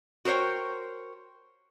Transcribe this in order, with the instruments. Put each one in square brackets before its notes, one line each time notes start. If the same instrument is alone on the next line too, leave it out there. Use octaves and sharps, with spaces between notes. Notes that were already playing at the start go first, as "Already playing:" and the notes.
[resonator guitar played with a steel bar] F#4 A#4 C5 C#5 G5